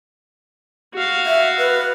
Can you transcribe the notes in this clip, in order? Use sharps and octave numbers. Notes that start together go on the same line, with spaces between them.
F#4 F5
E5
B4